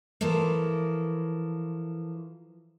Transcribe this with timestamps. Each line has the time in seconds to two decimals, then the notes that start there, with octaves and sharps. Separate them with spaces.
0.21 E3 F3 A4 A#4